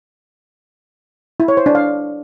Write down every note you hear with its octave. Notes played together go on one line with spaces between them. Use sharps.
E4
C#5
C5
D4
F5